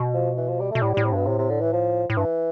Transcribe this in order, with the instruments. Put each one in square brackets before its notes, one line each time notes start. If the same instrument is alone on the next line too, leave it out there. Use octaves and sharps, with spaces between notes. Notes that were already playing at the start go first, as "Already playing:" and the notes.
Already playing: [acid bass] B2
[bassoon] F3
E3
F3
G3
A3
[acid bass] B2
[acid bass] A2 [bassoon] G3
[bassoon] G3
[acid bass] A2
[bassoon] C3
[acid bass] G2 [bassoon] B2
[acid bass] A2 [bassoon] C3
[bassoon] C3
D3
E3
F3
[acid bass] A2
[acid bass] G2 [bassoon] E3